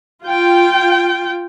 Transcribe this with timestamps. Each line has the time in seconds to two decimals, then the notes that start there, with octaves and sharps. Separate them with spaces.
0.24 F4 G5